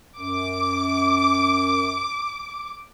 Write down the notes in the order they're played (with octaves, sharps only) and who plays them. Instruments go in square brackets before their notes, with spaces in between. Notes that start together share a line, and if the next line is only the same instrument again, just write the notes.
[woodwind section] F#2 [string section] D6